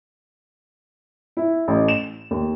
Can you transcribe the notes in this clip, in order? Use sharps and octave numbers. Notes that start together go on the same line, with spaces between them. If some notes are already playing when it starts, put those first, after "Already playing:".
E4
A1
E7
D#2